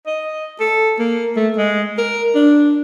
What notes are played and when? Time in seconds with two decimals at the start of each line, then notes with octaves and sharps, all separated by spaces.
0.06 D#5
0.60 A4
0.99 A#3
1.36 A3
1.57 G#3
1.98 A#4
2.35 D4